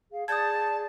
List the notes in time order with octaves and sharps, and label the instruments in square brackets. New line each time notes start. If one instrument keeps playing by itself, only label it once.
[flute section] G#4 F5
[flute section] G#4 D5 [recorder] A5 [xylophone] D#6 G6 G#6